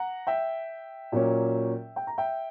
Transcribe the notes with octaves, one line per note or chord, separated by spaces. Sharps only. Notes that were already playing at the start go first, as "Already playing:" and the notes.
Already playing: F#5 A#5
E5 G5
A#2 F#3 A#3 C#4
G5
A#5
E5 G5